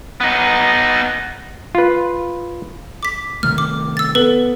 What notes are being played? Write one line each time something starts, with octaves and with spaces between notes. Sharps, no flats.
B3 D#4
F4 B4
D6 B6
C3 D#3 A3 F6
D6
E6 A6
B3 A4 B4